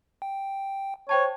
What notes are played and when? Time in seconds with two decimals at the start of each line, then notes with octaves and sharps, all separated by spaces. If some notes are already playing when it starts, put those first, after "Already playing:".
0.22 G5
1.09 C5 C#5 G5 A5